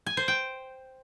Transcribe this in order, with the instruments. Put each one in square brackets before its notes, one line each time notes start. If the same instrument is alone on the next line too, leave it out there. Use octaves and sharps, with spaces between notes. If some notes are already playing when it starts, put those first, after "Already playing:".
[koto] G#5
C5
G5